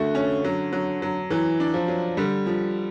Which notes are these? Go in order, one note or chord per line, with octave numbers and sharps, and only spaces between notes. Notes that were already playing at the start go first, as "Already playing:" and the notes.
Already playing: D3 A3 F#4
C#4
F#3
F#3
F#3
E3 F#3
D4
F3
F#3
D3 G3
F3